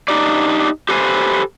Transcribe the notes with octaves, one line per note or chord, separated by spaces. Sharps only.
D4 D#4 G4 D5
G4 A4 B4 C5 G#5